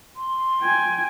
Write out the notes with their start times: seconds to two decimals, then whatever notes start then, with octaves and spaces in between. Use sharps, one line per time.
0.16 C6
0.62 G5 G#5